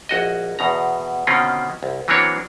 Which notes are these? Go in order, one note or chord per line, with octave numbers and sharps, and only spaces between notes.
A#1 F#4 D#5
E2 B2 A#5
B2 D3 D#3 C4 C#4 F4
C2
E3 F#3 A#3 C4 D4 C#5